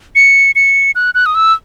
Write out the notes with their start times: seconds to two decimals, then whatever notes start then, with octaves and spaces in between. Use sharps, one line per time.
0.15 C#7
0.56 C#7
0.95 F#6
1.15 F#6
1.26 D#6
1.35 E6